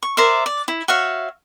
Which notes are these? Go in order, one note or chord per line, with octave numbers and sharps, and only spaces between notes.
C#6
A#4 C5 D5 E5
D5
E4
F#4 C#5 E5 F5